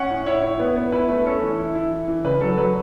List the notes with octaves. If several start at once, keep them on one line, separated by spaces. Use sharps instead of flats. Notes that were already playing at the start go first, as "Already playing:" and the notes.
Already playing: C#4 F#5
A2
E4 C#5
E4
B3
B3
E4 B4
A3 B4
C#4 A4
E3
E4
E4
E3
E3
C#3 B4
F#3 A4
F#3 B4